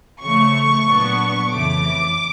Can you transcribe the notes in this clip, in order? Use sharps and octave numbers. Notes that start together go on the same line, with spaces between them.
C#3 F3 A3 C#6
A#2 F#3 B3 D4
F2 C#3 E3 A3 D6